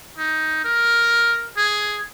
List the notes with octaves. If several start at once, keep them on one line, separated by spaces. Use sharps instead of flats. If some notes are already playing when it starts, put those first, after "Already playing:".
D#4
A#4
G#4